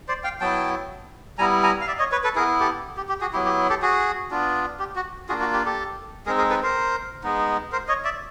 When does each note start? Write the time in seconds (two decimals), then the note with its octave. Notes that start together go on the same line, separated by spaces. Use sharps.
0.08 C5 D5
0.24 F5 G5
0.40 F#3 B3 E4 G5 A5
1.38 G3 B3 E4 G#5 A#5
1.63 G#5 A#5
1.81 F5
1.87 D5 E5
1.99 C#5 D#5
2.12 B4 C#5
2.23 A4 B4
2.35 B3 E4 G#4 A#4
2.60 G4 A4
2.97 G4
3.09 G4
3.21 F#4 G#4
3.33 F#3 B3 E4 G4
3.46 G4
3.70 G4 A4
3.82 F#4 G#4
4.31 B3 D4 F4
4.79 G4
4.96 F#4
5.29 A#3 D4 F4 F#4 G#4
5.40 F#4
5.53 G4
5.65 G4 A4
6.26 G#3 C4 D#4 G#4 A#4
6.38 G#4 A#4
6.50 A4 B4
6.63 A#4 C5
7.24 G#3 B3 D#4
7.72 A#4 C5
7.88 C#5 D#5
8.05 D5 E5